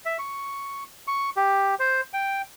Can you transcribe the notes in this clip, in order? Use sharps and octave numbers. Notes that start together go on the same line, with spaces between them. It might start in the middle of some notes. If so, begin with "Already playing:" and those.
E5
C#6
C#6
G4
C5
G5